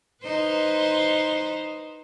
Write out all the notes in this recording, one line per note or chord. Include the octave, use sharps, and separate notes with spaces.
D#4 B4 C5